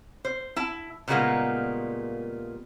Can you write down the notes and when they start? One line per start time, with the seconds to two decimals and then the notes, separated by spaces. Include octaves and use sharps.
0.25 C5
0.56 E4 A5
1.08 A#2 C#3 G3 G#3 A#3 B3